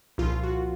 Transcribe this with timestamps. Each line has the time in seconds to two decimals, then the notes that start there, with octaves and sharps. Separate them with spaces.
0.18 C2 A#2 F3 F4
0.43 F#4